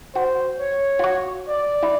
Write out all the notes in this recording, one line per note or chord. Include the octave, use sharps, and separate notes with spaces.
F#4 C5
C#5
F4
F#4
D5
E4